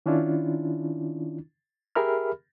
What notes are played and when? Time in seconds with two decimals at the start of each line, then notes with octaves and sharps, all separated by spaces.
0.06 D#3 C#4 D4 E4 F4
1.95 G4 G#4 A#4 E5 B5 F6